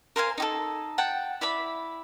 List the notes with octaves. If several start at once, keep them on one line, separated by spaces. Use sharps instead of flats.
A#4 C5 F5 G#5
D#4 G4 A4
F#5 G5 A5
E4 D5 E5 B5